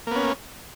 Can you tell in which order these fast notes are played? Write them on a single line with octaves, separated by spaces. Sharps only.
A#3 B3 C#4